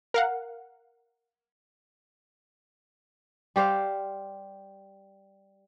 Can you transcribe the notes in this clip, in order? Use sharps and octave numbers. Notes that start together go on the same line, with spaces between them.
A#4 F5 F#5
G3 G4 C5 F5